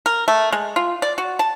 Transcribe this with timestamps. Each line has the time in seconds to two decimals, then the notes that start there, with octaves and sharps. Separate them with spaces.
0.06 A#4
0.28 A3
0.52 G#3
0.76 F4
1.02 D5
1.18 F#4
1.39 A5